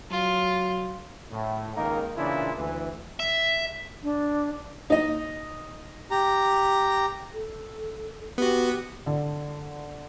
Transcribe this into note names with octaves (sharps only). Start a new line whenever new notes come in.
F#3 F4
A2
C#2 D#3 A#3 D#4 A#4
A#2 C#3 E3 D4 E4 F4
D2 E3
E5
D4
D#4 D#5
G4 A#5
A4
B3 F#4 G4
D3